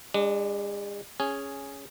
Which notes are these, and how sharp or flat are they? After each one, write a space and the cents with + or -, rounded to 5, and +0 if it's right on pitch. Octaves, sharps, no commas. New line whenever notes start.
G#3 -40 D4 +0
C#4 +0 G#4 +0